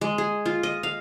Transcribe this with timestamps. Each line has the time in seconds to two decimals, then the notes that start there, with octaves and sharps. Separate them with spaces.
0.01 G#3
0.18 G#4
0.46 F4
0.63 D#5
0.83 F5